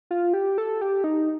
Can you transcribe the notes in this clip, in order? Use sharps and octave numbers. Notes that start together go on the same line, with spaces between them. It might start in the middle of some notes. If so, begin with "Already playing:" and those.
F4
G4
A4
G4
D#4